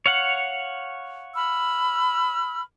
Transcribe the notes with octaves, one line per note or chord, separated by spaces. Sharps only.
C#5 F5 F#5
B5 E6 F6